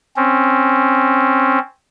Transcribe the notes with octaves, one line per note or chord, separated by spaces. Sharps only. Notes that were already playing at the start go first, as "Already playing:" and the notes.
C4 C#4